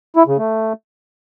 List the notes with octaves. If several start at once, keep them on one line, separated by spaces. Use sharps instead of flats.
E4
C#3
A3